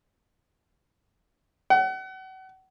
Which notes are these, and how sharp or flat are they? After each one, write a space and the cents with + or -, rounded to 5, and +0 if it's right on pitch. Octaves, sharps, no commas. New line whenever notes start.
F#5 +35